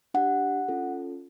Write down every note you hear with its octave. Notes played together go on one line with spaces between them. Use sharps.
D4 G4 F#5
C#4 F4 A4